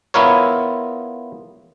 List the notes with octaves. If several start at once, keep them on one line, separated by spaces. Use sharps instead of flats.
B3 E4 F4 A#4 C#5